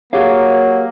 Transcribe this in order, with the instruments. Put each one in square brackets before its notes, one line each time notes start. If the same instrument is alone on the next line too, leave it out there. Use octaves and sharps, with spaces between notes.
[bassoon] F#3 [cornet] A#3 [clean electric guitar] G4 G#4 F5